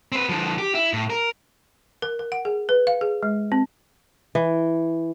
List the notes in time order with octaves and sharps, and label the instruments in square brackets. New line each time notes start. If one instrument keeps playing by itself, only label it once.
[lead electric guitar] C4 B4
D3 F3
G4
E4
A2
A#4
[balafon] A#4
A#4
F#5
G#4
B4
F5
G#4
G#3
C4
[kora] E3